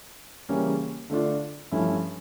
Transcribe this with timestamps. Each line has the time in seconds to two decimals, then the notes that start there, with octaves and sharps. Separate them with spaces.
0.49 C#3 E3 G3 A#3 C#4
1.10 D3 A3 D4 F4
1.72 G2 F3 A3 C#4 E4